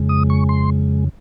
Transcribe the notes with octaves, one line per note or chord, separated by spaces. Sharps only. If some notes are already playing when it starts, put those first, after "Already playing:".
Already playing: F2 C#3 G#3
D#6
C#6
C6